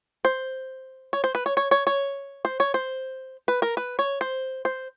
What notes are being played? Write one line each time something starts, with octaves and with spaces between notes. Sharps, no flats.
C5
C#5
C5
B4
C#5
C#5
C#5
C#5
C5
C#5
C5
B4
A#4
B4
C#5
C5
C5